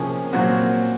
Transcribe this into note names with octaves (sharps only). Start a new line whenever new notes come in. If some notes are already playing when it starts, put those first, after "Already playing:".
Already playing: C3 F3 A#3 C#4 G#4
A#2 F#3 C4 F#4